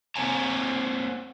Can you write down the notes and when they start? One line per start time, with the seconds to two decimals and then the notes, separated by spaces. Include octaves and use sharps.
0.16 A#3 C4 C5 C#5 G#5 A#5